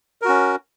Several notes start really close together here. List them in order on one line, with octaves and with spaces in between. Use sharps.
A#4 F#4 C#4